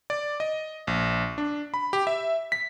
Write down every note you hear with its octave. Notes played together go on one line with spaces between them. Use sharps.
D5
D#5
A#1
D4
B5
G4
E5
B6